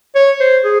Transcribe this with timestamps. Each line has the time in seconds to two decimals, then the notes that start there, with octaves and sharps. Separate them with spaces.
0.15 C#5
0.40 C5
0.64 G#4